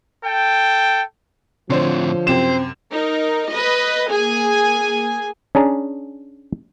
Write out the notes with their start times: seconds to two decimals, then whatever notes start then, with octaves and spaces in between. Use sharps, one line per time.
0.25 A4 G5
1.70 A2 D3 F3 C4 C5 C#5
2.27 F#2 C3 C4 C5 E7
2.90 D#4 A#4
3.51 B4 D#5
4.10 A#3 G#4 G#5
5.55 C#4 D4 G#4 A#5